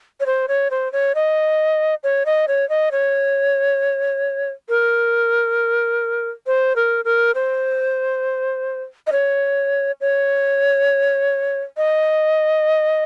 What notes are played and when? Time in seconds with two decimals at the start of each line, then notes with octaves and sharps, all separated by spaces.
0.20 C#5
0.26 C5
0.48 C#5
0.71 C5
0.93 C#5
1.15 D#5
2.03 C#5
2.26 D#5
2.48 C#5
2.69 D#5
2.92 C#5
4.69 A#4
6.47 C5
6.76 A#4
7.05 A#4
7.35 C5
9.07 D#5
9.12 C#5
10.01 C#5
11.77 D#5